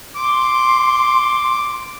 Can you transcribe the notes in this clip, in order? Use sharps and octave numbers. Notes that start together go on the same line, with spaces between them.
C6 D6